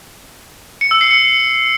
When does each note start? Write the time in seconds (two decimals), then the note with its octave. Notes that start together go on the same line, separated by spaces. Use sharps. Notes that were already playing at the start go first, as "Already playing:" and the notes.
0.81 C#7
0.91 E6
1.01 C7
1.11 C#7